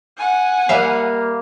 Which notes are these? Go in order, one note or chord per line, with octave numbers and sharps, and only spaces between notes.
F#5 G#5
G3 A#3 E5 F5